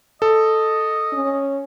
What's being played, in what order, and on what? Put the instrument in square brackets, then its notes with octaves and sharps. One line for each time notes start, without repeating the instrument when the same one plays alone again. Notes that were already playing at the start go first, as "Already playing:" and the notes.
[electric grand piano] A4 [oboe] D#5
[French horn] C#4